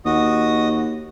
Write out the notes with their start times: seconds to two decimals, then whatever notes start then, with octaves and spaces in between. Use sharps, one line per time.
0.06 D#2 F#4 D#5 D#6